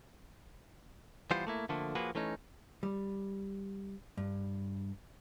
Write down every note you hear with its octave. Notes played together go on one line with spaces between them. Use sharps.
E3 G3 B3 F4 C5
A3 A#3 E4
D3 F3 A3 A#3
F3 A#3 F#4 G#4 B4
E3 A3 C#4 D#4
G3
G2